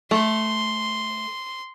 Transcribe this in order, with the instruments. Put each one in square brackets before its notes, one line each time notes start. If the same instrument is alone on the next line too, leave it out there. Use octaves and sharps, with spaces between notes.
[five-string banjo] A3 [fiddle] C6